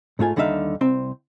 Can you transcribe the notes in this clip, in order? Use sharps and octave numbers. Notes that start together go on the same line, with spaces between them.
G#2 A3 F4 G#5
D#2 D3 G3 D#4 E5 F5
C2 C4